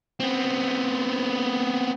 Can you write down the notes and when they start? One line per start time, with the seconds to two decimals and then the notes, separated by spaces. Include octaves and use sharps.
0.20 B3 C4